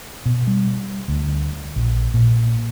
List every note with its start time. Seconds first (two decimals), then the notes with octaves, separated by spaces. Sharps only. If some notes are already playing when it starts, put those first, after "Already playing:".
0.26 B2
0.47 G3
1.08 D2
1.76 A#1
2.14 A#2